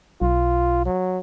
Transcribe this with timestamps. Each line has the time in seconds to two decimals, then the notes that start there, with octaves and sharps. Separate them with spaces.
0.22 B1 F4
0.86 F#3